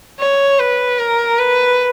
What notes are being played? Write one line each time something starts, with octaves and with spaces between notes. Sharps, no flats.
C#5
B4
A#4
B4